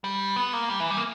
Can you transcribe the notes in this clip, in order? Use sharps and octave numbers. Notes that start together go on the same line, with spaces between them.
G3
B3
A#3
G3
E3
G3
A#3